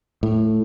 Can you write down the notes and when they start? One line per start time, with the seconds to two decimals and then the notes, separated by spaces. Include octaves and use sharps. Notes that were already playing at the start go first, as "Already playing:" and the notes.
0.23 A2